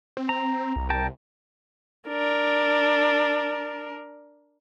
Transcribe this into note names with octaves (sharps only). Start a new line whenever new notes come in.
C4
A#5
C2
A#4 G5 A5
D4 A#4